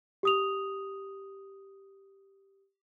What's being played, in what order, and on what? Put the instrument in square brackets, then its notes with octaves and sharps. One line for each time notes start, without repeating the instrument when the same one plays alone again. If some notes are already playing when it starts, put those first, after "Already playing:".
[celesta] G4 D#6 F7